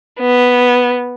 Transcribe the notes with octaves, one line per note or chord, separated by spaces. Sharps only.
B3